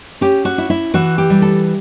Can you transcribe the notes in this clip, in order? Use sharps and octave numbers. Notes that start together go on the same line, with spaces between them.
C#4 G4
F#4
E4
E4
E3 F#4
G4
G3
A4